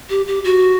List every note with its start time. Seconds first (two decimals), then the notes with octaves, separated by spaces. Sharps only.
0.10 G4
0.27 G4
0.44 F#4